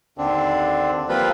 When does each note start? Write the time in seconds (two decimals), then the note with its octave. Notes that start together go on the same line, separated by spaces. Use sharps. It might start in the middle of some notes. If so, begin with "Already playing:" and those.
0.18 D#2 D3 C4 D4
1.09 F3 G3 A#3 C4 F4 B4